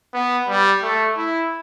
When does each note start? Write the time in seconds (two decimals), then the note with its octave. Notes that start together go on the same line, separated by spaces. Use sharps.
0.14 B3
0.48 G3
0.82 A3
1.17 E4